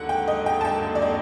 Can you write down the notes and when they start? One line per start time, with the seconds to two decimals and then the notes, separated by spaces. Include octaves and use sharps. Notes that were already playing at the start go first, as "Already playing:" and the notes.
Already playing: D#2 D3 F#3 A#3 F#5
0.09 G5
0.28 D#5
0.46 G5
0.61 A5
0.65 G5
0.95 D5
1.02 D#5